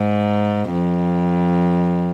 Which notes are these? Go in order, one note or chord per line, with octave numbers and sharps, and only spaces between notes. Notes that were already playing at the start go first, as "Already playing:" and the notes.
Already playing: G#2
F2